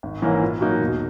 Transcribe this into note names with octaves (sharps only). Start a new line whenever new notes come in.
G#1
G#2 E3 A#3 C#4
A#2
F#3 A#3 D#4 F#4
E1